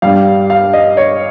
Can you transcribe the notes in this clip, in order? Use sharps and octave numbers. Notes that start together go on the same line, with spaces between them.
G2 G3 F5
F5
D#5
C#5